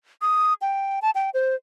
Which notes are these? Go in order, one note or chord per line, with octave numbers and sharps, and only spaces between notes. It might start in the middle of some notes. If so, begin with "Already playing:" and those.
D#6
G5
A5
G5
C5